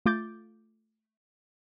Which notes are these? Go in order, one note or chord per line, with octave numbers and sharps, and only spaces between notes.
A3 F4 D6 G6 A6